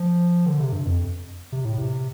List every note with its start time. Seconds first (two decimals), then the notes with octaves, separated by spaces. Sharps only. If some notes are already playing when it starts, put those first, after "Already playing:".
Already playing: F3
0.45 D3
0.59 C3
0.73 G2
0.86 F2
1.52 C3
1.65 A2
1.78 C3